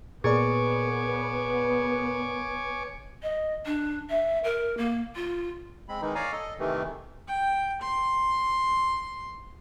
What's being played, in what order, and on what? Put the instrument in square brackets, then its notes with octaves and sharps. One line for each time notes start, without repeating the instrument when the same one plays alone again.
[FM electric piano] A#2 A#4 D5 [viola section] B3 [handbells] G#4 [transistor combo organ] C#5 G#5 D6
[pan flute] D#5
D4
E5
A#4
A#3
F4
[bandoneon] G#3 C4 B5
D#3 E3 G#3 D#4
C#5 D5 F5 G#5 A#5
A4 D#5
C3 D#3 E3 A3
[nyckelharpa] G5
C6